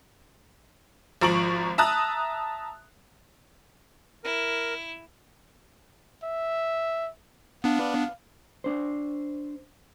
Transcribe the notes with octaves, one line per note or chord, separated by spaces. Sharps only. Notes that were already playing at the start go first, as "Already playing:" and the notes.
G#1 F3 A#5 C#6 D7 F#7
E5 A5 A#5 D#6 F#6
E4 A#4
E5
B3 D4 F5
D4 C5